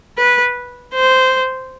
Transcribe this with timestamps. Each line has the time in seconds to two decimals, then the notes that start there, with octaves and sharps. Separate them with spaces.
0.18 B4
0.94 C5